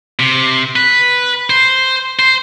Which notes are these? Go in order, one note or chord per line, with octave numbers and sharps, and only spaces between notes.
C3
B4
C5
C5